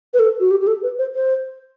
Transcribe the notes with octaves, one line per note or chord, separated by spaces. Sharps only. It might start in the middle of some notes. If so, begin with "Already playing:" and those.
B4
A4
F#4
G4
G4
A4
B4
C5
C5